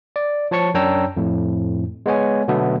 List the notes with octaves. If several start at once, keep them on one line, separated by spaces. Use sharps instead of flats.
D5
F3 C#5 A5 C#6 C#7
F#2 D4 C#5 G5 A#5 E6
F2 A2
G#3 B3 C#5 G#5
B2 D3 F#3 A3 B3 A4